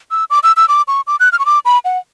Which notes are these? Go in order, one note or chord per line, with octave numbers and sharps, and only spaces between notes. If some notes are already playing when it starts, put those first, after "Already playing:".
E6
D6
E6
E6
D6
C#6
D6
F#6
F6
C#6
D6
B5
F#5